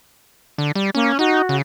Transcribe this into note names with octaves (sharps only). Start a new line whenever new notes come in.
D3
G3
A#3 C#4
D#4 F#4
C#3